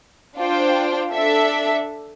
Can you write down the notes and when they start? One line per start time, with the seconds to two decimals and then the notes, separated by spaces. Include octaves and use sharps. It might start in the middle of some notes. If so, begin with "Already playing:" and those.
0.37 D4 F4 C5 G5
1.12 D4 A4 E5